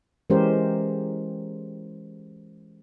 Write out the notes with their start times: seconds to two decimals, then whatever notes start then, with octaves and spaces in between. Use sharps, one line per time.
0.30 E3 G#3 C#4 G4 A#4 C5